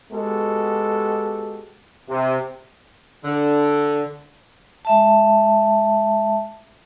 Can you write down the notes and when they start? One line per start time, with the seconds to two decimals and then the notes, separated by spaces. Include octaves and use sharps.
0.11 G#3 B3 F#4 G4 A4
2.08 C3
3.24 D3
4.85 G#3 E5 A5